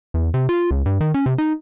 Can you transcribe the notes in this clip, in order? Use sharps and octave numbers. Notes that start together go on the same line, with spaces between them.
E2
C3
F4
C#2
G2
D#3
C#4
C3
D#4